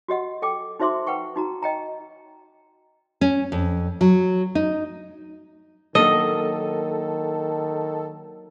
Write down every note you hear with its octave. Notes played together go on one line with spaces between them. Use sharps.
F#4 G4 D#5 F#5
A4 G5 D6
D#4 F#4 C5 E5 C6 D6
B4 F#5 G5 C#6
D#4 F#4 A#5
D#5 G5 A#5
C#4
F2
F#3
D#4
D#3 F#3 A#3 D4 A4 D#5